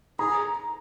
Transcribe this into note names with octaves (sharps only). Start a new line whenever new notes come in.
G#4 A#5